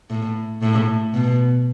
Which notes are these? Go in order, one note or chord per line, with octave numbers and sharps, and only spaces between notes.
A2
A2
B2